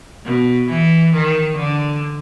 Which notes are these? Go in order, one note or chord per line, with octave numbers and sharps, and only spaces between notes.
B2
E3
D#3
D3